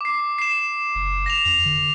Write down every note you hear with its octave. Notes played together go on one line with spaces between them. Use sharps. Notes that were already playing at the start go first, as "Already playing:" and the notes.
D6 C7
C7 E7
F#1
A#6 E7 F7
F2 F7
D3